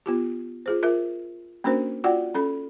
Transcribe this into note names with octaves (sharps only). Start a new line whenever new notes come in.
B3 F4 G4
F4 G#4 C5
F4 A#4 E5
A#3 C#4 D4 F#4 A#4 C5
F4 F#4 D5 F#5 G5
C#4 A4 B5